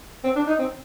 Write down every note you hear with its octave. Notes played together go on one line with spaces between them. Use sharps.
C4
D4
D#4
C4